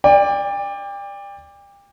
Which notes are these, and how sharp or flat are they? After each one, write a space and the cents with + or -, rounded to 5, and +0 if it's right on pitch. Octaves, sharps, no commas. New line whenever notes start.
D5 +0 G5 +35